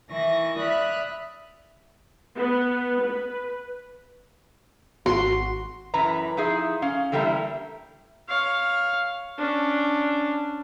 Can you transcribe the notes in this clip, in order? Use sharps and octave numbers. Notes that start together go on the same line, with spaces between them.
D#3 E3 E4 C#6 A#6
D5 E5 B5 D#6 F6 F#6
B3
B4
G#1 F#4 C6
F#2 E3 B4 A#5
F3 D#4 E4 G#4
C#4 F5
D3 E3 G3 A3 A#3 E4
C#5 F5
C#4 D4